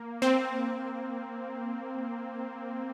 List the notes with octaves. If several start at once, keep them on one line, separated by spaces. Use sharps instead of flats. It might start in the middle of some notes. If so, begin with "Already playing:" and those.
Already playing: A#3
C4